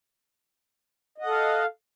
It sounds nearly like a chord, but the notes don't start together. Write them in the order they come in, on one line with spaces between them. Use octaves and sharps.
D#5 F#5 A4 F5